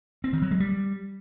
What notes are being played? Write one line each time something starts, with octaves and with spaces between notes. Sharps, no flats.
C4
D#3
F#3
G#3
G3